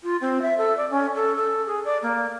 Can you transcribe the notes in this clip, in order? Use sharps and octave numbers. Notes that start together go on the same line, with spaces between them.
F4
C4
E5
A4
D5
C#4
A4
A4
G#4
D5
A#3